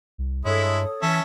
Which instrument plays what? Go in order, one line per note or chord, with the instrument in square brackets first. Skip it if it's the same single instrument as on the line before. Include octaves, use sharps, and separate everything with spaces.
[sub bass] C2
[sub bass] G2 [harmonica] G#3 E4 [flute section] A4 C#5 D#6
[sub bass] E3 [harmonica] C#4 E5 A5